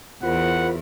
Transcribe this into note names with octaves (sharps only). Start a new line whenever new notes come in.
E2 F4 A#4 C5 F#5 B5